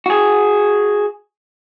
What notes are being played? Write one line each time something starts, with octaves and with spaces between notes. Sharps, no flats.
F#4 G#4